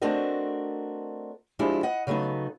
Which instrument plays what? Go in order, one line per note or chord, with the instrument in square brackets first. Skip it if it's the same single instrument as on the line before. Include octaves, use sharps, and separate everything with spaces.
[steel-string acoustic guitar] A3 C4 D4 F#4 A#4 D#5
F3 G#3 D4 E4 G4
D#5 F#5
C#3 F#3 A3 B3 D#4